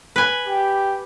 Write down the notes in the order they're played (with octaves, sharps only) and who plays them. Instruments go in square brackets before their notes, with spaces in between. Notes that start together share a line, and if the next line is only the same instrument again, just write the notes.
[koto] B4 G#5
[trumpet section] G4